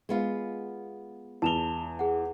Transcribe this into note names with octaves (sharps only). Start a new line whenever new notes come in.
G#3 B3 F4
E2 A5 E7 F7 G7
G#4 F#5